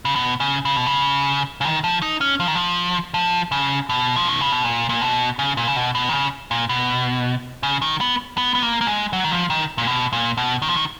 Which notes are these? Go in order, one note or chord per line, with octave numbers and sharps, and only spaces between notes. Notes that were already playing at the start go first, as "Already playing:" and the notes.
C#3
B2
C#3
C#3
B2
C#3
C#3
D#3
F3
D#4
C#4
F3
D#3
F3
F3
C#3
B2
F3
D#3
C#3
B2
A#2
A#2
B2
C#3
A#2
C#3
B2
B2
D#3
C#3
A#2
B2
C#3
D#3
B3
B3
B3
A#3
A#3
G#3
F#3
D#3
F3
D#3
A#2
B2
A#2
B2
D#3
F3
D#3